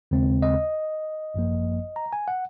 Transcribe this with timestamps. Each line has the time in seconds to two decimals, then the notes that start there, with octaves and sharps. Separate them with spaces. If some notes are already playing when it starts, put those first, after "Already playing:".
0.11 D#2 C#3 G#3 C4
0.42 D#5
1.34 G#1 F#2 F3 A#3
1.96 A#5
2.13 G#5
2.28 F#5